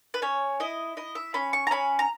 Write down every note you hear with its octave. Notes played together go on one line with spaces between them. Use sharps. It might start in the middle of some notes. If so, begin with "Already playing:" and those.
B4
C#4 C#5
E4 D#5
E4 D#5
E5
C#4 B5
C#6
A#5
C#4 B5
A#5